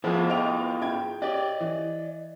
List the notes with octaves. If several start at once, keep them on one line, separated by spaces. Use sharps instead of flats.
F3 E4 F4 G#4
D#5 G5 F7
G5 G#6
G4 D5 D#5
E3